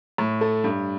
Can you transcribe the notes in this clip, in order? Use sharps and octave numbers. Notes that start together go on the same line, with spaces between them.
A2
A3
G2